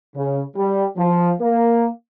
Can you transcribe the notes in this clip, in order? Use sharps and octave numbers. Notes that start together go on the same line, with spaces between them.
C#3
G3
F3
A#3